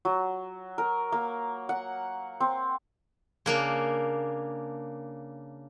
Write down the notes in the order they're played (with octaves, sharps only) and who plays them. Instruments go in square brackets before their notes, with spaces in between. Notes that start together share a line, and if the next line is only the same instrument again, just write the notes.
[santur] F#3
A#4
A#3
F#5
C4
[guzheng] C#3 A#3 D4